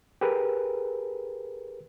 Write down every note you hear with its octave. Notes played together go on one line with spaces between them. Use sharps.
G4 G#4 A#4 B4